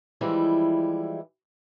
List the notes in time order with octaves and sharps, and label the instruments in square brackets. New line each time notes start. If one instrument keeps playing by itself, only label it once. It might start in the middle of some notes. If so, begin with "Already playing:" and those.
[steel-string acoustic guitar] E3 F3 G3 G#3 E4